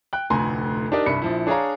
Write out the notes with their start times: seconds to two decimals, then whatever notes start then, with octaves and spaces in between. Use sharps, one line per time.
0.13 G5 F#6
0.30 F1 D2 A2 G#5 A#5 C6
0.92 D4 D#4 G4 A#4 D5 D#5
1.06 C2 G2 B5 C#7
1.22 A#1 F3 E4
1.47 D4 G#4 C#5 D5 F5 A#5